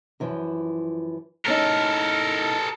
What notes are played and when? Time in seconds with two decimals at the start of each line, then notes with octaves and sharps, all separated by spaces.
0.20 F#2 E3 F3
1.46 A2 C#4 D#4 A4 A#4